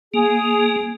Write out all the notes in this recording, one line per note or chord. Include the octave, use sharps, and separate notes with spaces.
A#3 G#4